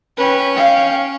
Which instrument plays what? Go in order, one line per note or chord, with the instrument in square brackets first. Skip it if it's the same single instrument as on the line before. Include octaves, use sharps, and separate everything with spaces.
[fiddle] C#4 [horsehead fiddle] B4 G5
[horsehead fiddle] F5 G5